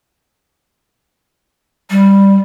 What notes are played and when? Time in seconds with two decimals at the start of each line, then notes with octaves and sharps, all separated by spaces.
1.90 G3